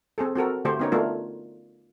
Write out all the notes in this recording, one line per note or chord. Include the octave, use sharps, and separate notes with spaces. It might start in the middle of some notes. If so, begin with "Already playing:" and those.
C4 G#4 A4
C4 F#4 A4 A#4
D3 A3 F#4 G4 C5
B3 C#4 D#4 A#4 C#5
A3 B3 D4 F4 A#4